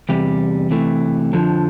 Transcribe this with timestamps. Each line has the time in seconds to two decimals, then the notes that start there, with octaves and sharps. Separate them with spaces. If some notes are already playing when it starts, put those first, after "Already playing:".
0.09 E2 C3 G3
0.71 C3 E3 A3
1.33 F2 D3 F3